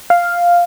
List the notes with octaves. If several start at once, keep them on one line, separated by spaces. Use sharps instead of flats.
F5